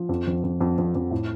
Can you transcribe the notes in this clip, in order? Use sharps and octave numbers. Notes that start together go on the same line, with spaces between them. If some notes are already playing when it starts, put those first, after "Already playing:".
Already playing: F3
F2
F2
F2
F2
F2
F2
A2